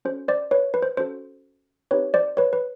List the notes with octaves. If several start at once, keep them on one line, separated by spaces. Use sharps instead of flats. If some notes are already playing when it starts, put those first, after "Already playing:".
C#4 F#4 A4 C5
C5 D5
B4 C#5
B4
C5
C#4 F#4 A4 C5
C4 D#4 G4 B4 C#5
C5 D5
B4 C#5
B4